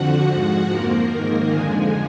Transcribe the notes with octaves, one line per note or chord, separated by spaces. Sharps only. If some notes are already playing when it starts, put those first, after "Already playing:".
Already playing: F2 D3 F3 F#4 F#5
G#2 F3
F2 F3 A#3 A#4
G#2 D#3
F2 D3 F3 G#3 G#4